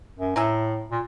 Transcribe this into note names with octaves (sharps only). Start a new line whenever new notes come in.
F#2
A2 E5 G#5 A#5
A#2